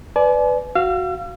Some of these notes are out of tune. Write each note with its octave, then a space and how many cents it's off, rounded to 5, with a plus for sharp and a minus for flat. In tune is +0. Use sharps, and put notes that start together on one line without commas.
B4 +15 D5 +0 G#5 +45
F#4 +0 F5 -10 E6 +45